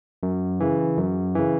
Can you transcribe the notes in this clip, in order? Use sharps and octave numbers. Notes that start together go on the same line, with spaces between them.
F#2
C#3 E3
F#2
C#3 E3